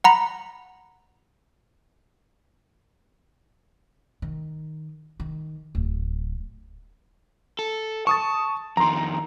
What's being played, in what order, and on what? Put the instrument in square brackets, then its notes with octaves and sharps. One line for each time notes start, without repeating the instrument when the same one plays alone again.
[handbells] F#5 A#5 B5
[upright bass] D#3
D#3
D1
[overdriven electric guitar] A4
[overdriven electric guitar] A5 [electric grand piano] C#6 D#6 A6
[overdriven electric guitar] F2 D#3 [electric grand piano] A#5 C6